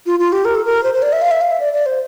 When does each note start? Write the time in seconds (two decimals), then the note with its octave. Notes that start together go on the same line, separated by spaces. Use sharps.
0.06 F4
0.19 F4
0.32 G4
0.45 A#4
0.55 A4
0.65 A#4
0.83 C5
0.94 C5
1.02 D5
1.13 E5
1.22 F5
1.31 E5
1.41 F5
1.51 E5
1.60 D5
1.73 D5
1.86 C5